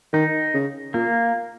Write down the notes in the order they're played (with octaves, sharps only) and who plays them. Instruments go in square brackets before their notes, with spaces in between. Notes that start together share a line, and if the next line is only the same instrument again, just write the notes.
[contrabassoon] D#3 [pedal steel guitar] D#4
[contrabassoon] C#3
[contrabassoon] A#2 [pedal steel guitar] A#3